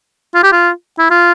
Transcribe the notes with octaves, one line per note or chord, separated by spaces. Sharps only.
F4
G4
F4
E4
F4